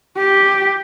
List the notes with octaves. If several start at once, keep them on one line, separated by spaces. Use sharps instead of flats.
G4